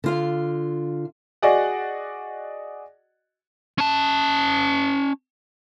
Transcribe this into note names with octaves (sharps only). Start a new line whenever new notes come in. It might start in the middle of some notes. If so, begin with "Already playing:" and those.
D3 F4 F5
F#4 G#4 D5 D#5 F#5
C#4 A5